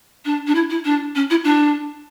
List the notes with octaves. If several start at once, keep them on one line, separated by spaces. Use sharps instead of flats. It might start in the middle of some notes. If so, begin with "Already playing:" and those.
D4
D4
E4
E4
D4
C#4
E4
D4